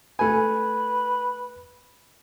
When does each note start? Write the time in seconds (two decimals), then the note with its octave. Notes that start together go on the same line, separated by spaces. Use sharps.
0.19 A3 B4 G#5